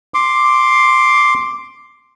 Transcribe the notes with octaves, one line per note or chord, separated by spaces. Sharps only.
C6 D6